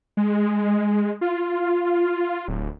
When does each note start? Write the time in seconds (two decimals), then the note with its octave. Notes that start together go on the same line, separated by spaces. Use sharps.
0.17 G#3
1.21 F4
2.48 D1